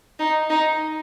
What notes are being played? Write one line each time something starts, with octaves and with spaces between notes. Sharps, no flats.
D#4
D#4